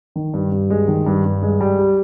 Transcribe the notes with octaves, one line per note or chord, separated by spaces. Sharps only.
D#3
G2
G2
G#3
D#3
G2
G2
G#3
G3
G4